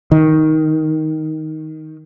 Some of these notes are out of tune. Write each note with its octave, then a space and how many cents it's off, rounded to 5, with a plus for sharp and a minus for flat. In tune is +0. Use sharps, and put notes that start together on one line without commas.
D#3 +10